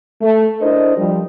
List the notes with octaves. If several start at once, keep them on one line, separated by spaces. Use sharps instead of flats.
A3
D4 E4 A#4 C5 D#5
F3 G3